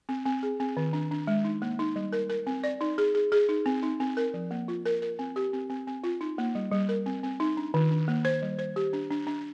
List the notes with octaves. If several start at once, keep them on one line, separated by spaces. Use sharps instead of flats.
C4
C4
G#4
C4
D#3
D4
D4
G#3
D#4
A#3
D#4
G3
A#4
A#4
C4
D5
D#4
G#4
G#4
G#4
D#4
C4
D#4
C4
A#4
F3
A#3
F4
A#4
A#4
C4
G4
C4
C4
C4
F4
D#4
A#3
G3
G3
A#4
C4
C4
D#4
D4
D#3
D4
A#3
C5
G3
C5
G4
D4
D4
D4